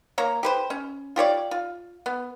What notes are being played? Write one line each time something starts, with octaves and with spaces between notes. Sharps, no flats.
A#3 C#5 A#5
G4 B4 C5
C#4
F4 G4 C#5 D5
F4
B3